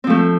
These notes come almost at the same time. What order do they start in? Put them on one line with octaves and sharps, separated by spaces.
C4 F3 A3